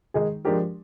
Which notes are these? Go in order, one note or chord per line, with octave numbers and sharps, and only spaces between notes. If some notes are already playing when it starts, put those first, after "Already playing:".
D#3 G#3 D#4 G#4
F3 G#3 D4 G4 A#4